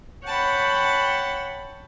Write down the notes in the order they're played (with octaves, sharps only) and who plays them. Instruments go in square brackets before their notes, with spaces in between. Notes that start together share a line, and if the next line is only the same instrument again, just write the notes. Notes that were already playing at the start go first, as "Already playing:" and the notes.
[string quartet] C#5 F#5 G5 A5 B5